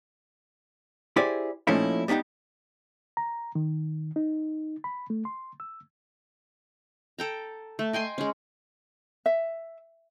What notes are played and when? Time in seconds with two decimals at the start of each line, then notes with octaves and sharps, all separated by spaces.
1.16 E4 G4 G#4 C5 D5
1.67 A#2 F3 A3 C#4 D#4 E4
2.08 G3 B3 C#4 D#4 G4
3.17 A#5
3.55 D#3
4.16 D#4
4.84 B5
5.10 A3
5.25 C6
5.60 E6
7.19 A4 G5 A#5
7.79 A3
7.93 D#5 G5 G#5 C6
8.18 G#3 C#4
9.26 E5